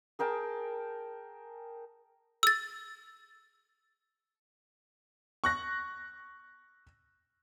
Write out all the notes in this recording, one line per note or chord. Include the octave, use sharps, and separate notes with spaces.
G#4 A#4 G5 A5
E6 A6
C#6 F#6 A#6